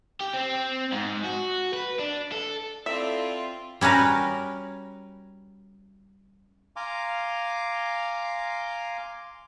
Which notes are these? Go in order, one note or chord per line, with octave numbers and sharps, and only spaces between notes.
G4
C4
G#2
F#4
B4
D4
A4
C4 E4 F4 A4 D5 E5
G3 C#4 F#4 A#4 B4
F5 G#5 A#5 C6 D6